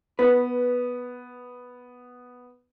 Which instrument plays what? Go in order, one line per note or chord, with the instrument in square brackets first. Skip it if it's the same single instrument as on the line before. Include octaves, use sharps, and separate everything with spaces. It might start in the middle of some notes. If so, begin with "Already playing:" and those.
[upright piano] B3 [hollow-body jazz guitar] B4